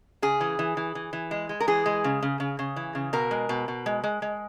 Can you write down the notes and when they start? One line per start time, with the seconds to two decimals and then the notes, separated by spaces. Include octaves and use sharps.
0.22 C#3 G#4
0.41 E3
0.59 E3
0.77 E3
0.95 E3
1.13 E3
1.31 G#3
1.49 G#3
1.60 A#4
1.68 E3 G#4
1.86 G#3
2.04 C#3
2.23 C#3
2.40 C#3
2.59 C#3
2.76 E3
2.95 C#3
3.13 B2 A#4
3.31 G#3
3.49 B2
3.68 B2
3.86 G#3
4.04 G#3
4.22 G#3